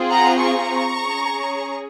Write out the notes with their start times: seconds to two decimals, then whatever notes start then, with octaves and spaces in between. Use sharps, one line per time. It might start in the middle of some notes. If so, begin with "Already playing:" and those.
Already playing: C4 F4 G#4
0.09 F#5 A#5
0.41 A#5 C#6
1.02 C#4 G#4